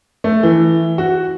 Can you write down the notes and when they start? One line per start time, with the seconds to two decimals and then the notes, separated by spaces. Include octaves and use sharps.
0.24 A3
0.43 E3
0.98 F#4